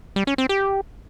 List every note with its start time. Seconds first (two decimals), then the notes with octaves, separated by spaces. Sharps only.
0.16 G3
0.27 C#4
0.38 C4
0.49 G4